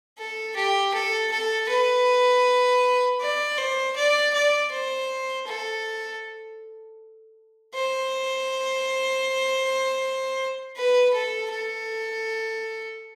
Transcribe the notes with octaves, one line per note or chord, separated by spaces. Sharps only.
A4
G4
A4
A4
B4
D5
C5
D5
D5
C5
A4
C5
B4
A4
A4